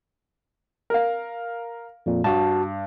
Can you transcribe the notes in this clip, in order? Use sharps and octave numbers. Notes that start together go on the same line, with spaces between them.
A#4 F5
F2 A#2
G2 F#4 A5